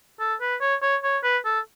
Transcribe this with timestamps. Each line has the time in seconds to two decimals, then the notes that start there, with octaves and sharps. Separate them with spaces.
0.20 A4
0.41 B4
0.61 C#5
0.82 C#5
1.04 C#5
1.23 B4
1.45 A4